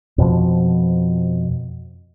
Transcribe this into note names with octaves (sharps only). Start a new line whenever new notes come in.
F2 B2 F3